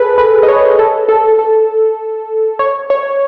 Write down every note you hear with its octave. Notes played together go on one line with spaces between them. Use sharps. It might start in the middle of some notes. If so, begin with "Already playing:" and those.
Already playing: G#4 A4 B4
B4
D#5
C#5
A4
A4
A4
C#5
C#5